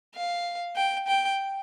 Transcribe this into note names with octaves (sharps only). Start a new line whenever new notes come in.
F5
G5
G5